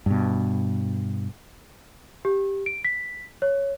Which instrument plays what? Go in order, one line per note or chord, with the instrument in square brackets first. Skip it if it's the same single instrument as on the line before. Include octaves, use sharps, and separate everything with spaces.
[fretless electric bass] G2 B2
[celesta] G4
D7
B6
C#5